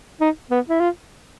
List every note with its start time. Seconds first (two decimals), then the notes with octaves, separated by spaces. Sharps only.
0.21 D#4
0.51 B3
0.69 E4
0.80 F4